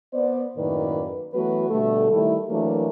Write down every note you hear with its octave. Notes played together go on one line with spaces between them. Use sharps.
B3 C5 D5
F#2 A2 D#3 A#3 B4 D5
E3 F#3 A3 B3 F#4 B4
B2 D3 G3 A3
D#3 G3 A3 E4
E3 F#3 A3 A#3 D4 A#4